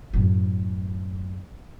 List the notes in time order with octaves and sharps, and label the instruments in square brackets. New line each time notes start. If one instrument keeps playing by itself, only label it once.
[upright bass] F#2 A2